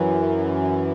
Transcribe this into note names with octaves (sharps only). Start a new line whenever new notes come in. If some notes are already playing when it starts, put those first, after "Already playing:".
Already playing: F#2 E3